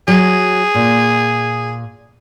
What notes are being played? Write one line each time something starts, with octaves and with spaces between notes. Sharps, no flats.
F#3 G#4
A#2